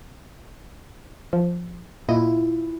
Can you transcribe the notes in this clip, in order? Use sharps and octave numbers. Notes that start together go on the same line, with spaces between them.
F3
A#2 E4 F4 D#5